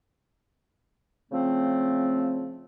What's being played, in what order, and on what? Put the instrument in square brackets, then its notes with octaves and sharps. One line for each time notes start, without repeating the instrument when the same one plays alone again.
[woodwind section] C#3 F3 A3 C4